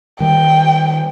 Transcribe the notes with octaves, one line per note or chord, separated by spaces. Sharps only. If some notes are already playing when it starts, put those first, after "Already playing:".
D#3 G3 G5